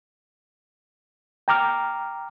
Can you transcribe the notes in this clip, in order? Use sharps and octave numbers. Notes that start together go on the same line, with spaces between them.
G5 A#5 D6 F6